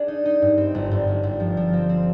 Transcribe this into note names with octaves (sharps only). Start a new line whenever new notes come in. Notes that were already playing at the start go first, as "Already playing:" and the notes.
Already playing: D4 G#4
D#4
D#4
G2
C4
G1
G1
G1
G1
F3
F3
C4
C4